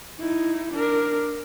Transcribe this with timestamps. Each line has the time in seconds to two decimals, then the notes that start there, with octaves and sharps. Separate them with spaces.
0.20 D#4 E4
0.74 D4 A#4